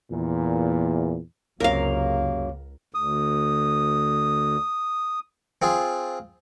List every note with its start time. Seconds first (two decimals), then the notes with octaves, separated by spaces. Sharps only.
0.11 E2 A#2
1.60 C#2 F#2 C3 A#3 A#4 F5
2.94 D2 D#6
5.62 C4 F4 G#4